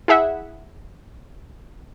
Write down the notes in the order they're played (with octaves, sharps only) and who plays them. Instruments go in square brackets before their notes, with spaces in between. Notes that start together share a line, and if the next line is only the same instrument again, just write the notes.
[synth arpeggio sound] E4 G#4 E5 F#5